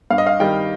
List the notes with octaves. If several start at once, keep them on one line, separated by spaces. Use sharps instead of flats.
G2 F5
D#5
F5
D#3 G3 G5